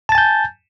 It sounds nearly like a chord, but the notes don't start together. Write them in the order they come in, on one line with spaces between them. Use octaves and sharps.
A5 A6 G#5 G6